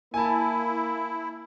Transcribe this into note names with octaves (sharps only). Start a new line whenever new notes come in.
A#3 E4 G#5 A5